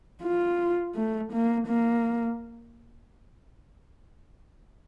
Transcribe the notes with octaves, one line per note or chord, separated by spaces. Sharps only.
F4
A3
A#3
A#3